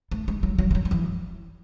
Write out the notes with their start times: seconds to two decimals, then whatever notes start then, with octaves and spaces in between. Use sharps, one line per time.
0.11 A3
0.28 G#3
0.43 F#3
0.58 F#3
0.71 E3
0.75 F#3
0.85 F#3
0.91 E3